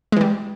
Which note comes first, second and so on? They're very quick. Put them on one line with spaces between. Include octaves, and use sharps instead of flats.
G#3 E3 G3